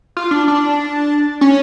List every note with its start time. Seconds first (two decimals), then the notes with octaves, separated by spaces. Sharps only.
0.17 F4
0.31 D4
0.48 D4
1.41 C#4